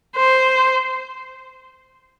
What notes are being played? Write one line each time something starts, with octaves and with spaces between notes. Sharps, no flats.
C5